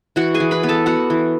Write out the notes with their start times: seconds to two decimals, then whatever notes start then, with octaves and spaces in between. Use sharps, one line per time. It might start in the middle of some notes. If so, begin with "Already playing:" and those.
0.16 E3 F#4 F#5
0.34 G#4 G#5
0.40 E3
0.51 B4 B5
0.63 B3
0.69 A4 A5
0.86 B3 F#4 F#5
1.10 E3